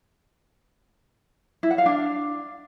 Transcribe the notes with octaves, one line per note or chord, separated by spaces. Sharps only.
E4
F#5
F5
D4